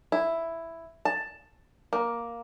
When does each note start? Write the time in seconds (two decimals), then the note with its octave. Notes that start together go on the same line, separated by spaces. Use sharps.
0.12 E4
1.05 A5
1.93 A#3